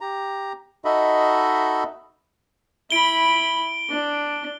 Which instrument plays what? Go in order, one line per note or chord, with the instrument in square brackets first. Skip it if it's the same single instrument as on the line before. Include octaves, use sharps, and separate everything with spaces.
[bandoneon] G4 A#5
D#4 F#4 A4 D#5 E5 B5
[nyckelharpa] E4 B5 [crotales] D7 G7
[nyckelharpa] D4